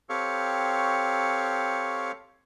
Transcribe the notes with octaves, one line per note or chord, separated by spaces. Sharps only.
C4 G4 A4 C#5 F5 C#6